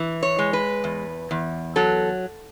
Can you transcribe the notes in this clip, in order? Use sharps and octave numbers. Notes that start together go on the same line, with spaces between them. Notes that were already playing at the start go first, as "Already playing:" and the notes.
Already playing: E3
C#5
G#3
B4
E2
E2
F#3 A4